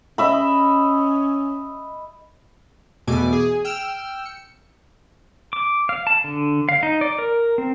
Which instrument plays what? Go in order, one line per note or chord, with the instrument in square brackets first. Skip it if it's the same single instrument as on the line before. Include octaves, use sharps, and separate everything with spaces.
[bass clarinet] C#4 [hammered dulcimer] D#5 E5 B5
[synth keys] E2 B2 A3 G#5 D6
G#4
G5 E6 F6 E7
C#7
[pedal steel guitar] D6
F5
A5
D3
F5
D#4
D5
A#4
C4